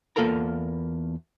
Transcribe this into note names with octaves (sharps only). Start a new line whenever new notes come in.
E2 A#3 F4 A4 A#4 A#5